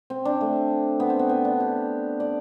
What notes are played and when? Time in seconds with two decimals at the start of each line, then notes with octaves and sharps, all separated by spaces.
0.10 C4
0.25 D4
0.41 A3
1.00 B3
1.10 C4
1.19 B3
1.29 B3
1.45 D4
1.60 G4
2.20 D5